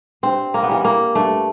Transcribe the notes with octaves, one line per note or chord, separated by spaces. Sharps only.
G2 C4
A#3
B3
E3 G3 A#3
A#3
G2 A3